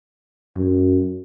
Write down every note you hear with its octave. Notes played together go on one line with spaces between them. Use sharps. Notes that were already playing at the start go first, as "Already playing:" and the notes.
F#2